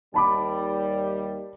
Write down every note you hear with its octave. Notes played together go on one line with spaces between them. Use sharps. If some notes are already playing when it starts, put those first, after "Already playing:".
D#2 G3 A5 B5 D6